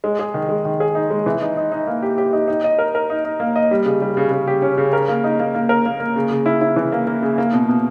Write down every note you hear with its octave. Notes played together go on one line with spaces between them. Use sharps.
G#3
G#4
D#3
G#3
D#3
G#4
D#4
G#3
E3
D#4
D#4
D#4
A#3
G4
G4
D#4
D#4
D#5
A#4
A#4
D#4
D#4
A#3
D#5
G3
C#3
G3
C#3
C#3
G4
C#4
C#3
A#4
A#3
D#4
A#3
A#3
A#4
A#3
A#3
C#3
C#3
E4
E4
E3
A#3
A#3
C#3
A#3
B2
B2